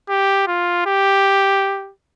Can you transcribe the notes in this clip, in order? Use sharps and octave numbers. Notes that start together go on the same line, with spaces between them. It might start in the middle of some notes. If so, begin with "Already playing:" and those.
G4
F4
G4